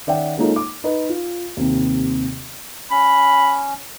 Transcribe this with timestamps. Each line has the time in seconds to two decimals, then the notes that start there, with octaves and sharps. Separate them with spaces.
0.07 D#3 C#4 D5 E5 F#5 G5
0.38 G#3 A#3 C#4 D#4 F4 A4
0.56 D6
0.84 D#4 B4 D#5
1.09 F4
1.57 D#2 C3
2.91 C#4 B5